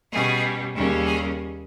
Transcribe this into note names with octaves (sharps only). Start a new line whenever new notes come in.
B2 G3 C#4 G#4
D#2 C#3 G3 A#3 C#4
G#4